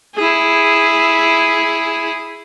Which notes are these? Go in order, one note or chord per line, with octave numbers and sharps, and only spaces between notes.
E4 G#4